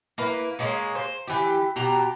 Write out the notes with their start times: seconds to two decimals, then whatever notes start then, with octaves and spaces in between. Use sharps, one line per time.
0.18 A#3 E4 B4
0.59 G#3 A#3 C#4
0.95 C5
1.27 E3 G4
1.76 B2 G4 A#5